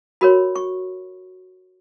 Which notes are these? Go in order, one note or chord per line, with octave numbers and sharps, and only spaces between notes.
F#4 A#4 C#5 B5
C#6